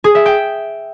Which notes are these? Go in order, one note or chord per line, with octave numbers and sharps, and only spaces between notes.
G#4
E5
G5